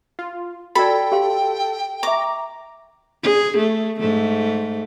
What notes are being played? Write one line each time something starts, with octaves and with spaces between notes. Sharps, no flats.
F4
F#4 A4 D5 G5 B5
G4 F5 C6
E5 A#5 C#6 D6
G#4
A3
G#2 A3